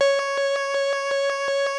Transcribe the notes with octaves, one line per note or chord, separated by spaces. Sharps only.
C#5